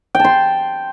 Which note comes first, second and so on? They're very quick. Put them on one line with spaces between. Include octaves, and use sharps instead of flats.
G5 A5 C6